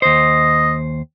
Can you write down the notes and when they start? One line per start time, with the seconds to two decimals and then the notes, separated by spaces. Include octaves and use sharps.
0.02 D#2 C5 D#5